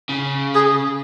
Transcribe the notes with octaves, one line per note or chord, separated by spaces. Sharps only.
C#3
G#4